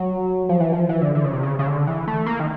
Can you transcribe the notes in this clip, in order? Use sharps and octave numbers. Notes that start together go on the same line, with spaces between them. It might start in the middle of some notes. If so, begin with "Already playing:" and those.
Already playing: F#3
F3
E3
F3
E3
D3
D3
C#3
C3
C#3
C#3
D3
E3
A3
A#3
D#3